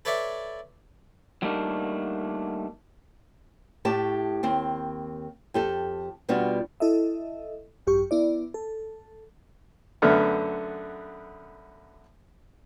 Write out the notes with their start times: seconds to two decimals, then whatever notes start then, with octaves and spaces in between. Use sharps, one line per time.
0.05 A4 B4 C#5 D5 E5
1.42 F#3 G3 A3 A#3 D4 D#4
3.85 A2 A3 G4 A5
4.43 D#2 C4
5.54 F2 G4 A4
6.29 B2 G3 B3 D4 F4 F#4
6.80 E4 A4 D#5 E5
7.87 G#1 F#2 G4 C#6
8.11 B3 E4 D5
8.54 A4
10.02 F#2 D3 A3 B3 F6